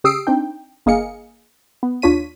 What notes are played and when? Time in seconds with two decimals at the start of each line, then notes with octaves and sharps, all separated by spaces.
0.04 C#3 G4 D#6 E6 C7 D7
0.27 C4 D4 D#4 G5
0.86 G1 A#3 G#4 D#5 F5 C#7
1.83 B3
2.02 D#2 D4 F4 C#5 B6 D#7